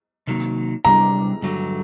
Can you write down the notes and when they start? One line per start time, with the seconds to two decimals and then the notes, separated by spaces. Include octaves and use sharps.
0.27 C3 D#3 F#3 A#3
0.85 C3 G3 D4 A#5
1.42 G2 D3 F#3 A3